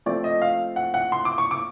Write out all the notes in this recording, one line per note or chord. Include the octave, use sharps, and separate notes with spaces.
F3 A3 C4 D5
D#5
F5
F#5
F#5
C6
D6
C#6
D6